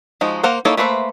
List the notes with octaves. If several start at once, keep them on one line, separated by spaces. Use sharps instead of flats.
F3 G#3 D#4 F#4
A#3 C5 F5 F#5
A#3 D#4 E4 A4 C#5
A3 A#3 B4 C5 E5